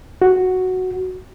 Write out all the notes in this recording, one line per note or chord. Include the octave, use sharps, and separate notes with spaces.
F#4